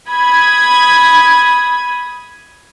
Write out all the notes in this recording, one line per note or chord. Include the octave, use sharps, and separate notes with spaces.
B5 D#6 G#6